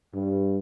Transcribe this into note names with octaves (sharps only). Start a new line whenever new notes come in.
G2